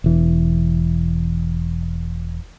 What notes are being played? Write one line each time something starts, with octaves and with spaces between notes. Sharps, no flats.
E1 E3